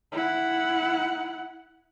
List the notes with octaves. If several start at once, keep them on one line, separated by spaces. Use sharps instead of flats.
E4 F#5